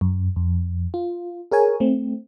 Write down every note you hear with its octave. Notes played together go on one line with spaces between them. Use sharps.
F#2
F2
F4
G#4 A#4 C#5 G#5
A3 C4